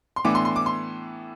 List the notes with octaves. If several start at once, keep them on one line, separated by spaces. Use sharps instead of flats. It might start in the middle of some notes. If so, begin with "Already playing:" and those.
C6
A2 E3 B3 D4 D6
C6
C6
D6
C6